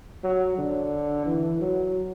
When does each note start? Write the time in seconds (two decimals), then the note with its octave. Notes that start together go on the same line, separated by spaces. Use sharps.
0.23 F#3
0.58 D3
1.26 E3
1.61 F#3